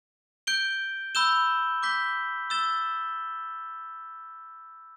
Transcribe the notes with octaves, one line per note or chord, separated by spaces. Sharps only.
G6 D7 G7
B5 E6 G6 E7 G7
D6 G6 B6 G7
E6 A6 E7 G7